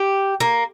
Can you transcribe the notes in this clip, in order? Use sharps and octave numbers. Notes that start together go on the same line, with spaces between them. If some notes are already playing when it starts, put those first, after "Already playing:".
Already playing: G4
A#3